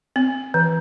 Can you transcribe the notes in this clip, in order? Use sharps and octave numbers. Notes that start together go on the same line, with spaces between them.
C4
E3